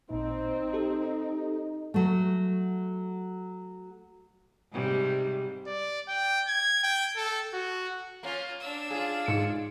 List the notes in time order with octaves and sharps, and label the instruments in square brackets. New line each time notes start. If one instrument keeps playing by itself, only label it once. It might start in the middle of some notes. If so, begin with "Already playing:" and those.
[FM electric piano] A1 A#2 [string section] C4 [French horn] D#4
[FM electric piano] G4 A4
[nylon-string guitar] F#3 A3
[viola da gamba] G#2 C3 G3
[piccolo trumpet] D5
G5
G#6
G5
A4
F#4
[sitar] A#3 C#4 [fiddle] F4
[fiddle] D4 E6
[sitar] F4 G#4 [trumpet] F5
[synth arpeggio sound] G#2 C#7